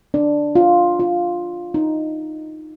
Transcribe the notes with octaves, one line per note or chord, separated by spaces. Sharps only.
D4
F4
F4
D#4